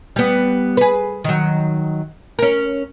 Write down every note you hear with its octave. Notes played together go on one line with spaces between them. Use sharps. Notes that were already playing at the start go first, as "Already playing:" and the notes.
G3 B3
G#4 B4
D#3 F#3
C#4 A#4